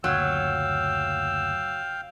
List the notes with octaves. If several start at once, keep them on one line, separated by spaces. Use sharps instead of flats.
F#1 D2 A#2 F#3 F5 G5 E6